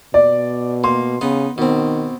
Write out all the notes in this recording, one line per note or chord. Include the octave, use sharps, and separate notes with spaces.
B2 D5
A#3 C6
C#3 B3 D#4
B2 D#3 C4